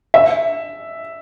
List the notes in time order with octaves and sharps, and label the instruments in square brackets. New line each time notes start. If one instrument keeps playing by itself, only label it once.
[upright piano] E5